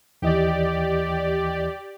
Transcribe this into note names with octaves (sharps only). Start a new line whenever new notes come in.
D#2 E3 G4 D5 D#5